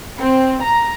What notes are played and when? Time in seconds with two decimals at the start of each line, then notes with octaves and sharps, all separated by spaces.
0.18 C4
0.63 A#5